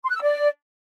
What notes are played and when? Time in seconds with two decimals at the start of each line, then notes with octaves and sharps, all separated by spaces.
0.04 C6
0.10 F#6
0.15 E6
0.21 D5